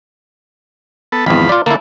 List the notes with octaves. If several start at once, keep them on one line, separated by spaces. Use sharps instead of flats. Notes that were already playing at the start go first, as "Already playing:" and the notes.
B3 A4
G#1 E2 F3 B5
F4 D5
D3 A3 A#3 E4